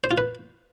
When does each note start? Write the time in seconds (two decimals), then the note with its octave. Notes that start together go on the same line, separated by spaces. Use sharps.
0.04 C5
0.11 F4
0.18 B4